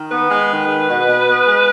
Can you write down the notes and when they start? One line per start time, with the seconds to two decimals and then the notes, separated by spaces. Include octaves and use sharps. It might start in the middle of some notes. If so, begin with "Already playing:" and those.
Already playing: D#3
0.11 B3 B4
0.30 G#3
0.50 D#3
0.68 G#3
0.87 B2
1.08 B2
1.27 B3
1.46 G#3